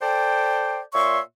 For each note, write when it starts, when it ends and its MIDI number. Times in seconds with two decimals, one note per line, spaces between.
0.01 0.80 69
0.01 0.80 72
0.01 0.80 74
0.01 0.80 79
0.94 1.20 46
0.94 1.20 73
0.94 1.20 76
0.94 1.20 84
0.94 1.20 85